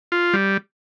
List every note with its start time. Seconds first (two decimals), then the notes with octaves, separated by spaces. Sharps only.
0.12 F4
0.33 G3